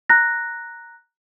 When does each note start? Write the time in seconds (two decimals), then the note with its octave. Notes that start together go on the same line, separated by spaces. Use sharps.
0.10 A#5 F#6 A#6